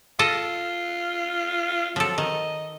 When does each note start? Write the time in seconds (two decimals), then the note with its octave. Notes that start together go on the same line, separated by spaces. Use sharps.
0.19 F4 A4 D#5
1.96 F3 F#3 A4
2.18 D#3 D#5